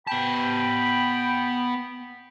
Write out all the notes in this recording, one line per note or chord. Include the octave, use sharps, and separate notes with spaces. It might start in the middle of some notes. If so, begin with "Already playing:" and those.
B3 G5 A5 B5